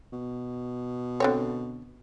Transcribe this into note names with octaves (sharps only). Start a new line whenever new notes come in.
B2
D3 C4 C#5